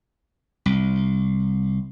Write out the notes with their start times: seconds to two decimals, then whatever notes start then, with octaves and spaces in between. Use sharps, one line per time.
0.66 C2